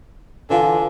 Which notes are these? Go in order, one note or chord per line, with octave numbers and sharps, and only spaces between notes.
D3 E3 F4 G#5